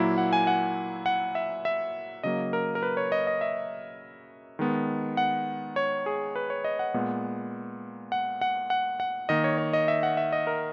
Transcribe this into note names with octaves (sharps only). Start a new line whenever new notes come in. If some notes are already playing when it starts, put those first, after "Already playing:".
Already playing: A#2 F#3 A#3 E4
F#5
G#5
F#5
F#5
E5
E5
C#3 F#3 A#3 D#5
A#4
A#4
B4
C#5
D#5
D#5
E5
D#3 G#3 B3
F#5
C#5
G#4
B4
C#5
D#5
F#5
A#2 G#3 B3
F#5
F#5
F#5
F#5
D#3 A#3 D#5
C#5
C#5
D#5
E5
F#5
E5
D#5
A#4